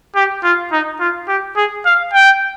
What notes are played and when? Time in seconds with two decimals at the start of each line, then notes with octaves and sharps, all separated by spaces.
0.15 G4
0.44 F4
0.72 D#4
1.00 F4
1.28 G4
1.57 G#4
1.86 F5
2.14 G5